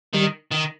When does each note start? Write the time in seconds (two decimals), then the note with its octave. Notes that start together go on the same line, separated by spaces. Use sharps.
0.13 D#3 G3
0.51 D#3